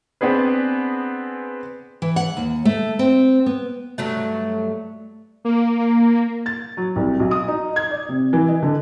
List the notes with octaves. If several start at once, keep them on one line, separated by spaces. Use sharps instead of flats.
B3 C4 D4 G#4 B4
E3
F#5
D#2
A3
C4
B3
G2 F#3 A3
A#3
A6
F#3
C2
B1
D#6
D#4
G#6
D5
C3
E3
D#5
D3